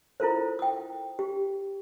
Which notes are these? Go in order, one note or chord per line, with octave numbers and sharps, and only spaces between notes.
E4 F4 A4 A#4 C5
G5 D#6
G4